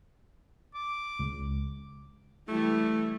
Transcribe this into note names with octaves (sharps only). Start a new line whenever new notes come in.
D6
C#2
E3 G3 A3 E4